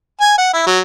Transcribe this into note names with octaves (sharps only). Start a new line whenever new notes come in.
G#5
F#5
E4
F#3